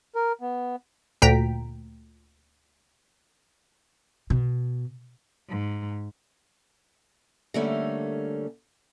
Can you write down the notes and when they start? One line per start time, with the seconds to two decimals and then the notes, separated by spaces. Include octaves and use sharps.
0.15 A#4
0.41 B3
1.22 D2 A#2 G5 A#5 B6
4.30 B2
5.48 G#2
7.54 D3 G3 A3 A#3 C#4